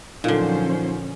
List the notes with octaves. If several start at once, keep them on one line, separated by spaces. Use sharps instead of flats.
A#2 D3 F3 F#3 C#4 D#4 F4 C5